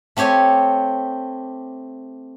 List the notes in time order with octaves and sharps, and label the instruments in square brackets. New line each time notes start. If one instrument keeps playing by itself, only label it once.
[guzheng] A3 C4 G4 C#5 G#5